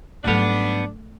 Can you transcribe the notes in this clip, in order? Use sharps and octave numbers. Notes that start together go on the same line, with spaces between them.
G#2 F#3 G3 A3 B3 D4 A4